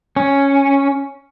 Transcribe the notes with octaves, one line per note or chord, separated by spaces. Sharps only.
C#4